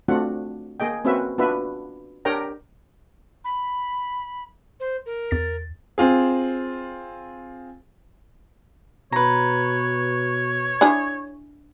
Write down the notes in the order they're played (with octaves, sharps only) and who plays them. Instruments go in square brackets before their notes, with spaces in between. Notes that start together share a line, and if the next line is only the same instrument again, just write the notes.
[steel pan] A3 C4 D4 F4 F#4 F#5
A#3 G#4 D#5 G5
A#3 C4 C#4 F#4 B4 E5
B3 D4 F4 F#4 B4 E5
D4 G4 A#4 C#5 G5 A#5
[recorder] B5
C5
A#4
[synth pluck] E2 A6
[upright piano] C4 F4 G#4
[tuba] B2 [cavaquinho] B4 A#5 [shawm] C#5
[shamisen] D4 E4 G#4